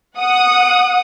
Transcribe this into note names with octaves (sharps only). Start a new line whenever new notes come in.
F#5 D#6